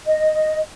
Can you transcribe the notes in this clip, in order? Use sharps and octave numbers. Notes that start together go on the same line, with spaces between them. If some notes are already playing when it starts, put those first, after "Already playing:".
D#5